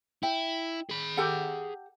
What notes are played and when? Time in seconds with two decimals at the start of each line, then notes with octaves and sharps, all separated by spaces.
0.23 E4 G5
0.89 G#4 B5
1.17 G4 A4 F#5